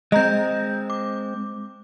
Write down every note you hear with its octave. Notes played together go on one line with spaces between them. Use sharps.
G#3 C4 D#5 A#5 G6
D6